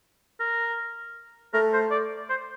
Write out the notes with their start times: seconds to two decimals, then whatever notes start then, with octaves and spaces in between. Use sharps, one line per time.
0.40 A#4
1.54 A3 A#4
1.73 C5
1.91 D5
2.29 C5